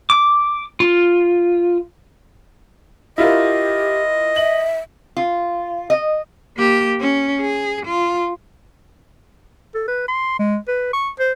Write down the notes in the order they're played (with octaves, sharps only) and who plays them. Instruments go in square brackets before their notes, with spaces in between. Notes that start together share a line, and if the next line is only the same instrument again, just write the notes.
[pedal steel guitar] D6
F4
[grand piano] E4 F4 A#4 [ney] G4 [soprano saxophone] D#5
[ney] E5 [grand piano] F#7
[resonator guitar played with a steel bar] F4
D#5
[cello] A#3 G4
C#4
G#4
F4
[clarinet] A4
B4
C6
G#3
B4
C#6
C5